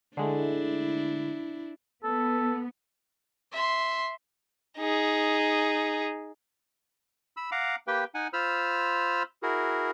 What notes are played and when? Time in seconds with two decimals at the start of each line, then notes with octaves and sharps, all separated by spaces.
0.17 D3 G#3 A3 D4 E4
2.04 B3 A4
3.52 E5 C6
4.78 D#4 G#4
7.37 B5 E6
7.52 F5 F#5 A#5 D6
7.87 A#3 G4 B4 G5
8.15 D#4 F#5 G#5
8.33 F4 C5 B5 E6 F6
9.43 E4 F#4 G#4 A#4